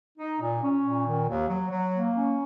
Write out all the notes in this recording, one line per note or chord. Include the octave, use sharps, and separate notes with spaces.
D#4
A#2
C#4
A#2
D#3
D#2
F#3
F#3
A#3
C#4